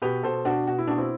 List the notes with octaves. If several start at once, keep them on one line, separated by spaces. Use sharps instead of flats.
B2 G4 B4
B2 A4 C5
B2 D4 F#4
B2 F#4
E4
B2 D4
C4 E4